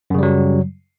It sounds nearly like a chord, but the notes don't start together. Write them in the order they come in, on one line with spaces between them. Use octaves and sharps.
F#2 C#3 G3 F#3